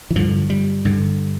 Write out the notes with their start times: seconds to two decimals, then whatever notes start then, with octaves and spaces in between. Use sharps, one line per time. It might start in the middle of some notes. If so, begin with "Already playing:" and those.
0.11 E3
0.16 G2 D3 F3
0.50 G3
0.85 G2 D3